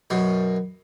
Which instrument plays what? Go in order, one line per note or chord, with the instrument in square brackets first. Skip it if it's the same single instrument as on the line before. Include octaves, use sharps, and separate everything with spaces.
[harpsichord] F#2 B2